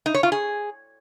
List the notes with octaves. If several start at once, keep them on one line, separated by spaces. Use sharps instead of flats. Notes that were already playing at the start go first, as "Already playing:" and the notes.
D#4
C#5
F4
G#4